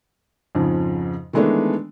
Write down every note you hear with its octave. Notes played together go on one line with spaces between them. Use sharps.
F2 G#2 C#3 F3
D#3 E3 G#3 A3 B3 D4